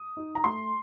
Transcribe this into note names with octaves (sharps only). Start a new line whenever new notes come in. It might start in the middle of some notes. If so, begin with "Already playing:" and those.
Already playing: D#6
D#4
A#5
A3 C6